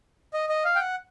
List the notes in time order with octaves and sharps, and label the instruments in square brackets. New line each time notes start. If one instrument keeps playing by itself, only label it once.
[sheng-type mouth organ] D#5
D#5
F5
G5
F#5